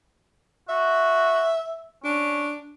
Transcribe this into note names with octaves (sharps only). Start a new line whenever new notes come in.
F#4 E5
C#4 D4